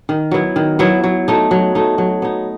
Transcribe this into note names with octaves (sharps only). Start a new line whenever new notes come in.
D#3
F#3 B3 E4
D#3
F#3 B3 E4
F#3
A3 D#4
F#3
A3 D#4
F#3
B3 D#4